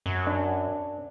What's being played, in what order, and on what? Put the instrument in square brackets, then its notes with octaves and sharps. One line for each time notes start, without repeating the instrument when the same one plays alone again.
[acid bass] F#2
[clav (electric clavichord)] D4